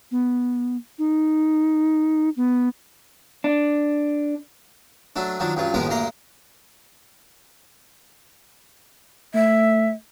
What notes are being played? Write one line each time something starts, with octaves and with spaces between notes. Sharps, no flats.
B3
D#4
B3
D4
F#3 A3 D4
D#3 F3 F#3 D4
C#2 G2 F#3 F4
D#2 A2 F3 G#3 B3 A#4
D2 G2 A#3 A#5 C6
A3 E5